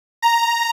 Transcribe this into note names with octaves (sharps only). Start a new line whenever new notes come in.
A#5